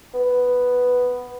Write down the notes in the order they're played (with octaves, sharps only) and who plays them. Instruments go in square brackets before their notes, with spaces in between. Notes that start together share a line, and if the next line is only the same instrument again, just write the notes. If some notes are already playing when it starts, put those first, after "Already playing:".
[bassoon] B3